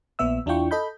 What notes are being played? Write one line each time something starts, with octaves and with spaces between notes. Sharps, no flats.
A#1 A#2 B3 E5 E6
E2 D4 E4 F4 G5 C#6
A4 D#5 B5 G6